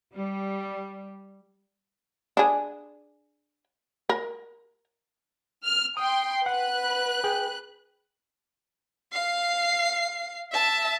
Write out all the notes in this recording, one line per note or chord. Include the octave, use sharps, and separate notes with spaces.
G3
D4 G#4
A#4
F6
G5 C6 D#6
B4 F#5 F#6
G#4 G5
F5 C7
E5 A5